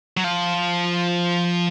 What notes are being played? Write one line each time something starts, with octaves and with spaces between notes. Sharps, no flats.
F#3
F3